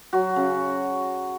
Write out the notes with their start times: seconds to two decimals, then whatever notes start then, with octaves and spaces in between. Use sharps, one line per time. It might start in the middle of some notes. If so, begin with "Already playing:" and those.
0.13 F#3 F#4
0.36 C#3